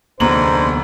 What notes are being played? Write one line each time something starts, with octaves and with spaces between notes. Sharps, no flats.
F1 D2 G#2 A#3 B3 D4 C5 F#7